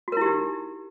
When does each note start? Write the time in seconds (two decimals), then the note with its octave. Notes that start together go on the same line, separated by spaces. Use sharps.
0.08 F#4
0.12 A#4
0.17 E4
0.21 G4
0.26 D#4